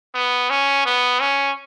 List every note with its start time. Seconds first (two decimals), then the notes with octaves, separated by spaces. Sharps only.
0.14 B3
0.50 C#4
0.85 B3
1.20 C#4